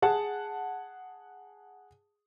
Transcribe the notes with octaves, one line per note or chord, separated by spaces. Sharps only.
G#4 F#5 A5